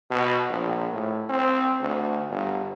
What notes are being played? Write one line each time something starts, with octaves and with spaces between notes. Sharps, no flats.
B2
A#1
A2
C4
D2
G1